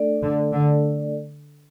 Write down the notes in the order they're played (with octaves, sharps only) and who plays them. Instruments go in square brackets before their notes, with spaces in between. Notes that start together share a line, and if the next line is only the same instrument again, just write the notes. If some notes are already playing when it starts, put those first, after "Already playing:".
Already playing: [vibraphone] A3 D4 A4 D5
[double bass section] D3
D3